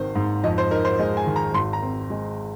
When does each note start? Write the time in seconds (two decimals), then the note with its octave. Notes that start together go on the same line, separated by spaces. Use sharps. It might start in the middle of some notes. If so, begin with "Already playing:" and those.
Already playing: G#1 D#3 C4 C5
0.15 G#2
0.43 F2 D#5
0.58 C5
0.71 D#4 A#4
0.85 C5
0.99 G#3 D#5
1.17 G#5
1.26 D#3
1.36 A#5
1.54 G#1 C6
1.73 A#5
1.82 C4
2.10 G#3